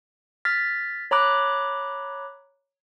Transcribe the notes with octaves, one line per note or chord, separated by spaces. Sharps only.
F6 A6 B6
C#5 A#5 B5 D6 F#6